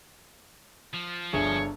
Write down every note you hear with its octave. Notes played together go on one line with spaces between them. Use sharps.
F3
G1 D4 G#4 C#5 E5